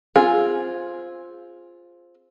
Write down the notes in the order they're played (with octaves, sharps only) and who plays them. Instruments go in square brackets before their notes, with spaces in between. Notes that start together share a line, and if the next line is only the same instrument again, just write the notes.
[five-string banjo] C4 F4 G#4